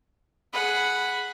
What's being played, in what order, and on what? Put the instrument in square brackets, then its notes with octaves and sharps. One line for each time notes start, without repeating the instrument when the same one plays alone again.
[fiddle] G#4 B5 [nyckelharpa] F#5